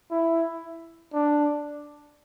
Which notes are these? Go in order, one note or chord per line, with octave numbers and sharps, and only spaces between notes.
E4
D4